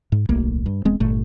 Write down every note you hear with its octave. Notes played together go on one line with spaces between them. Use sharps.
G#2
D1 B1 A3 A#3
G2
E1 G#3 B3 C4
G1 A#2 A3